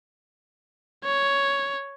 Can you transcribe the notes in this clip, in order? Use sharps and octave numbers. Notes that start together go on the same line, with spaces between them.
C#5